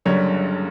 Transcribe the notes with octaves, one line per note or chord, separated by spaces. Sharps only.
F#1 F#2 D3 G3 C#5